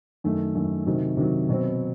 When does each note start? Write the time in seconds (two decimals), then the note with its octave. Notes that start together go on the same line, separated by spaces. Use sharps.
0.24 F#2 D#3 A3
0.55 F#2 D#3 A3
0.87 C3 D#3 F#3
1.17 C3 D#3 F#3
1.49 B2 F#3 C4